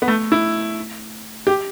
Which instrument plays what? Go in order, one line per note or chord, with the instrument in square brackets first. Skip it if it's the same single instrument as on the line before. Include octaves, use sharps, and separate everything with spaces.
[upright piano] B3
A3
E4
G4